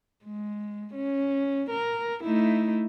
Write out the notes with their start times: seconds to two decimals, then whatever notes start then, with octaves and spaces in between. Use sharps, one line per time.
0.24 G#3
0.95 C#4
1.71 A#4
2.24 A3 D#4 E4